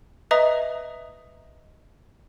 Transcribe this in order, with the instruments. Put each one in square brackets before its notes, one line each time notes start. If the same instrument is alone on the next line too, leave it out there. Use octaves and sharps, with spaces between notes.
[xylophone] B4 D#5 E5 A#5 D#6